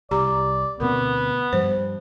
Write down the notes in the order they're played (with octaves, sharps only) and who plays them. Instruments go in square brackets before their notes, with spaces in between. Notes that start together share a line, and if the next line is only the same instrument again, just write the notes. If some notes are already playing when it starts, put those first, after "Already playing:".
[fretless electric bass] C2 [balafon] G4 A#5 [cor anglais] D5
[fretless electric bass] D2 B2 C4 [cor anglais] B3 [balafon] A#4
[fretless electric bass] G2 F3 G3 [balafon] C5